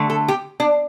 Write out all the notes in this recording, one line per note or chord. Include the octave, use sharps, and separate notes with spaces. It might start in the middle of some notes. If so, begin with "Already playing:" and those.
Already playing: D3 A3
A4
G4
D4